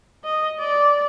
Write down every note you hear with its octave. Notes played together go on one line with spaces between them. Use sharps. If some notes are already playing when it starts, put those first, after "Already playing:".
D#5
D5